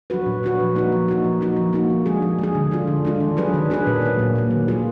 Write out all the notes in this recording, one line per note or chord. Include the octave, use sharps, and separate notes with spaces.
F#3 D4 F#4 B4
A#2
F#3 D4 F#4 B4
F3
A#3 D#4 F#4
F3
A#3 D#4 F#4
F3
A#3 D#4 F#4
F3
A#3 D#4 F#4
F3
G#3 D4 G#4
F3
G#3 D4 G#4
D3
G#3 D4 F4
D3
G#3 D4 F4
D#3
F#3 D4 G#4 B4
D#3
F#3 D4 G#4 B4
A#2
F#3 A#3
A#2
F#3 A#3
D#3
F#3 A#3 F4 G#4